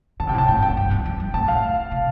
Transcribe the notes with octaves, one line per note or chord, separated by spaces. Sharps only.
D3 A5
C3 G5
A2
A5
A2 G5
F2 G5
G2
G2
F2
G2
A2 A5
F5
C3